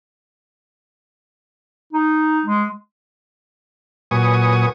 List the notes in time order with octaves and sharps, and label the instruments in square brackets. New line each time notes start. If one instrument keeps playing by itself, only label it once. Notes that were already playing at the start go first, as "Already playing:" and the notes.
[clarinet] D#4
G#3
[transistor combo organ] A#2 F#3 B4 G#5 C#6 D#6